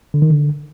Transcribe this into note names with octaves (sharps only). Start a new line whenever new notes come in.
D3
D#3
D3